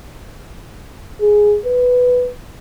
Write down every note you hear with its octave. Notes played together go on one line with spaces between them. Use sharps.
G#4
B4